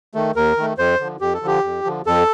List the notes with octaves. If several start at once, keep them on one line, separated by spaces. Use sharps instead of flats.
D#3 A3
D#2 A#4
D#3 A3
F2 C5
D3 F3
F2 G4
A4
D3 F3 G4
F2
D3 F3
F2 A4